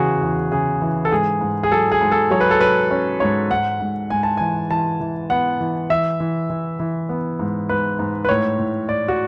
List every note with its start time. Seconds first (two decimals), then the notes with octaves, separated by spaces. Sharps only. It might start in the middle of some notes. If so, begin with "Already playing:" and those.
Already playing: E2 C#3 E3 F#4 G#4
0.22 E2
0.52 C#3 G#4
0.81 E3
1.05 A4
1.11 G#2 G#4
1.41 G#2
1.63 G#4
1.71 F#3 A4
1.92 G#4
2.01 G#2
2.12 A4
2.31 F#3 C#5
2.41 B4
2.51 A4
2.60 F#3 B4
2.91 C#4
3.20 G#2 C#5
3.50 G#2 F#5
3.81 G#2
4.10 G#2 G#5
4.23 A5
4.37 E3 G#5
4.70 E3 A5
5.00 E3
5.30 B3 F#5
5.60 E3
5.90 E3 E5
6.20 E3
6.50 E3
6.79 E3
7.09 B3
7.39 G#2
7.69 G#2 B4
7.99 G#2
8.25 B4
8.29 A2 C#5
8.59 A2
8.89 A2 D5
9.08 F#4